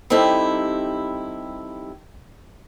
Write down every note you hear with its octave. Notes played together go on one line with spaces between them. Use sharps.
G3 C4 D#4 E4 G4 A4